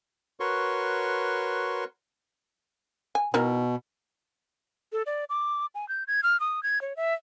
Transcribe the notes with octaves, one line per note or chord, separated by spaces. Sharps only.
F#4 A#4 B4 C#5 C6 C#6
G#5
B2 D#3 E4 A#4
A4
D5
D6
G#5
G6
G#6
F6
D#6
G#6
C#5
E5